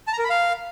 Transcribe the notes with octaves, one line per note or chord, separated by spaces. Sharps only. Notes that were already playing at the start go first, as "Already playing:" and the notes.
A5
A#5
A#4
B5
F5